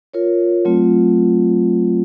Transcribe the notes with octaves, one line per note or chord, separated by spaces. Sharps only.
F4 A#4 C#5
F#3 A3 C4 F4